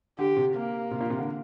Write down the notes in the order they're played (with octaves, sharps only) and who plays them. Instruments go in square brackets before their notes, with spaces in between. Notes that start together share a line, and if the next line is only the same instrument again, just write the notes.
[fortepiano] D3 [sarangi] G4
[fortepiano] C3
[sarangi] A#3
[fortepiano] C3
A#2
C3
D3